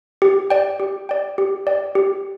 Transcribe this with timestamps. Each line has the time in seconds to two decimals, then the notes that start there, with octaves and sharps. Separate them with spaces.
0.22 G4
0.50 D5 G5
0.80 G4
1.09 D5 G5
1.38 G4
1.67 D5 G5
1.95 G4